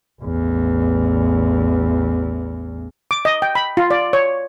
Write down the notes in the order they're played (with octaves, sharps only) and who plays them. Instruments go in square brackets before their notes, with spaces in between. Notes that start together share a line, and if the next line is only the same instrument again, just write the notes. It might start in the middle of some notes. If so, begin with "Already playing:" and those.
[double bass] A1 E2
[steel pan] D6
D#5
G5
B5
F4
D5
C#5